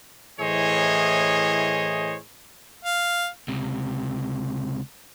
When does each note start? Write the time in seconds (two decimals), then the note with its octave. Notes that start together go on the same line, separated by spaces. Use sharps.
0.40 A2 E3 G#4 C5 C#5 D#5
2.85 F5
3.48 C#2 C3